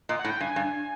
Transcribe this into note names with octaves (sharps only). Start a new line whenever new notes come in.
A#2 D#5
F#5
A2
G5
G2 G#5
G2